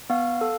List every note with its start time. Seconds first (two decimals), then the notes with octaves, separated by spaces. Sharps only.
0.10 B3 F5
0.41 A4